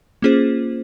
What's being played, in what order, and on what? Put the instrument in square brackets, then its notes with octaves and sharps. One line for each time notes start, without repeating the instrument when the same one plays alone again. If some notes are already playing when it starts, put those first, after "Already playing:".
[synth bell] A#3 C#4 F4 G#4 C5